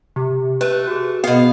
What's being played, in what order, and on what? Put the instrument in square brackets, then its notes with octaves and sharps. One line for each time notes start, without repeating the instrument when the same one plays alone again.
[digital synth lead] C3 [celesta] G4
[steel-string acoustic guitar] A3 [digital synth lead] B4
[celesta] F#4 G#4
[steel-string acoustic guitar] B2 F5 [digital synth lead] B3